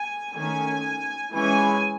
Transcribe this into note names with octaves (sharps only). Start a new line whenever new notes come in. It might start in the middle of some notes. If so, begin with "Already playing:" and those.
Already playing: G#5
D#3 A3 C#4 G#5
E3 G#3 C#4 G#5